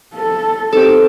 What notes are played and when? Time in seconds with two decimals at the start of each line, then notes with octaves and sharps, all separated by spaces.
0.15 A4
0.72 C4 D#4 G4 A4